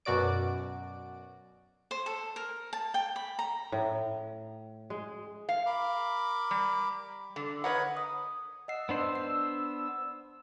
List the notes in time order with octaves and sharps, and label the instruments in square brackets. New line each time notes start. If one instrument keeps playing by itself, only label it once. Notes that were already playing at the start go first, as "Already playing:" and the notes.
[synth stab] F#2 B2 F#4 D5 D7
[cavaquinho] C5
A4
A#4
A5
G5
B5
A#5
[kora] A2
G#3
[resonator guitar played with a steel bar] F5
[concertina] A#4 B5 D6
[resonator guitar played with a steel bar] G3
D3
[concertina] A#4 D#5 B5 [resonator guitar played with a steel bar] B4 C#5 F#5
[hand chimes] D#6
[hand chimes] D#5 F#5 C7 [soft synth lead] E6
[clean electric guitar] B3 D4 C5
[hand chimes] C7